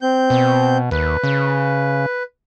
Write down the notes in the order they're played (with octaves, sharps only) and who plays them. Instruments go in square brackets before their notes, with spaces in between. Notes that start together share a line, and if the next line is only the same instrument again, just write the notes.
[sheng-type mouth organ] C4 G6
[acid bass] B2
[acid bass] D#2 [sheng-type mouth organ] B4
[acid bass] C#3